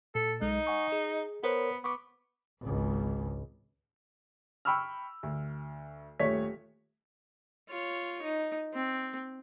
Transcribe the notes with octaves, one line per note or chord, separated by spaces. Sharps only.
A#2 A4
B1 G#3 D#4
F#5 G#5 C#6
G#4
B3 A#4 C5 C#5
B3 C#6 D6
G#1 C#2
G5 B5 C#6 E6 F6
D2
D#1 A3 C#5 B6
F4 C#5
D#4
C4